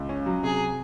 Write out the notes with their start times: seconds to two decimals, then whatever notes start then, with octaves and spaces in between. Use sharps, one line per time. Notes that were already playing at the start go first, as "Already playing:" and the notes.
Already playing: C#2
0.09 C#4
0.26 F#3
0.43 C3 G#4